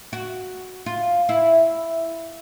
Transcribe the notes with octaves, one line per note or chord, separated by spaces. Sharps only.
F#4
F4
E4